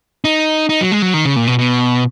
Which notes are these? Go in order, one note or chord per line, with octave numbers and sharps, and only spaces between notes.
D#4
D#4
F#3
G#3
F#3
D#3
C#3
A#2
B2
B2